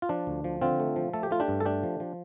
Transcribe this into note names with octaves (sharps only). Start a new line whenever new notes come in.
F4
F3 D4
D2
F3
D3 C4 F4
A3
F3
A3 A4
G4
A3 F4
D4 G4
G2
A4
A3 D4 G4
F3
F3